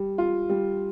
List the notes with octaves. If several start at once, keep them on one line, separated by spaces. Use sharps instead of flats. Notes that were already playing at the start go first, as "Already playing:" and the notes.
Already playing: G3
F4
G3